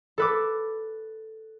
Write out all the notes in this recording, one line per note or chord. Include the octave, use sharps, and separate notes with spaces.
A4 B4 D6